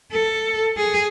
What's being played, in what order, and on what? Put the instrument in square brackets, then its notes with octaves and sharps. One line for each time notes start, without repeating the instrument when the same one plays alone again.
[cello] A4
G#4